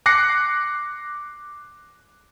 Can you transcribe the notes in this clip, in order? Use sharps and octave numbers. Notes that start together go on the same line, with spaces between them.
D6 F#6 A#6 C7 C#7